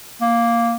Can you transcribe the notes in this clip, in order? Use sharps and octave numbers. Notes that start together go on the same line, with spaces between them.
A#3